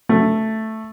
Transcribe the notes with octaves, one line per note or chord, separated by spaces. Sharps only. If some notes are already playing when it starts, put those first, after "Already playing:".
A3